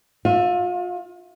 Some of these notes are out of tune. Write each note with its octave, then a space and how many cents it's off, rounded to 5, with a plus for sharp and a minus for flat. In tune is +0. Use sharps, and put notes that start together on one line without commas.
F4 +35 E5 +0